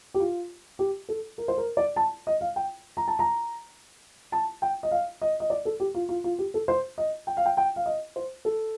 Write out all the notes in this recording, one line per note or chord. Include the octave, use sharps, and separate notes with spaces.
G4
F4
G4
A4
A#4
C5
A#4
D5
A5
D#5
F5
G5
A#5
A5
A#5
A5
G5
D#5
F5
D#5
D#5
D5
A4
G4
F4
F4
F4
G4
A4
C5
D#5
G5
F5
G5
G5
F5
D#5
C5
A4